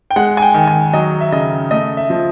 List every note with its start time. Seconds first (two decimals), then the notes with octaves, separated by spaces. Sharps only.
0.11 G5
0.16 G#3 F#5
0.37 G#5
0.42 G5
0.54 D#3
0.67 G#5
0.93 F#3 D#5
1.21 E5
1.32 C#3 D#5
1.71 A3 D#5
1.97 E5
2.10 F3